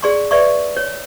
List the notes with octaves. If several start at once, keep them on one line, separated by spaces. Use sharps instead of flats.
G#4 D5 C6 C#6
B4 D5 E5 C#6
C#5